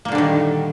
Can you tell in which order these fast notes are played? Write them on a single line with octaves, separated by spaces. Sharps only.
A#3 A#2 D3 G3 D#3